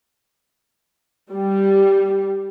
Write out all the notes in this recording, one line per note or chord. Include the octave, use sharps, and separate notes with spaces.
G3